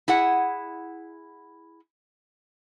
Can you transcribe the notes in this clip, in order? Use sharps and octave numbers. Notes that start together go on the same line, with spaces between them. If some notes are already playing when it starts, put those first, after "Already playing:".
E4 G#4 F#5